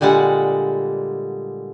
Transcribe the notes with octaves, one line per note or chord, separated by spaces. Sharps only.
A#2 D3 G3 G#3 F#5